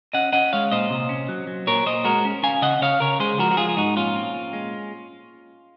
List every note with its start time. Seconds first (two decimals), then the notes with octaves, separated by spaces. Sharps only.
0.14 C#4 D#5 F#5
0.33 C#4 D#5 F#5
0.53 G#3 C#5 F5
0.72 A#2 C5 D#5
0.90 C3
1.09 C#4
1.29 F#3
1.47 F#3
1.67 A#2 A#4 C#5
1.86 A#2 C5 D#5
2.04 G#3 F#4 A#4
2.25 C#4
2.43 C#4 F5 G#5
2.62 C#3 D#5 F#5
2.81 C#3 C#5 F5
3.00 C#3 A#4 C#5
3.20 G#3 G#4 C5
3.38 F3 F#4 A#4
3.51 F#4
3.57 G#3 F4 G#4
3.69 F4
3.77 G#2 D#4 F#4
3.96 A#2 C#4 F4
4.15 C4
4.34 A#2
4.53 G#3